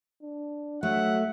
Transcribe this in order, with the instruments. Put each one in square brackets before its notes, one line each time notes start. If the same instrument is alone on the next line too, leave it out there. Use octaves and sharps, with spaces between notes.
[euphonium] D4
[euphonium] F#3 [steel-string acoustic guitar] A3 [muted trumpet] E5 [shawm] F#5